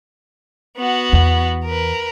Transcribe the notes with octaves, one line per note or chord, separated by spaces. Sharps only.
B3 F#4
E2
A#4 B4